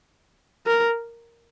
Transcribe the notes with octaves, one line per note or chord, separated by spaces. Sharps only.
A#4